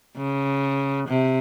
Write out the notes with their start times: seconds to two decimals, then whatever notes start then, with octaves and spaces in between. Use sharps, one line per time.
0.17 C#3
1.09 C3